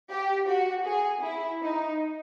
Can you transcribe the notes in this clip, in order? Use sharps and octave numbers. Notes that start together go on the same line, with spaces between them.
G4
F#4
G#4
E4
D#4